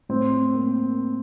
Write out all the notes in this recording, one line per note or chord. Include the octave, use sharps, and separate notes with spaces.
A2 C4
A#3